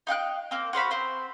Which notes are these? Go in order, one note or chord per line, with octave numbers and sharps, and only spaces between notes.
D#4 F5 G5 F#6
A#3 C4
F#4 C5 F5 B5
C4 C5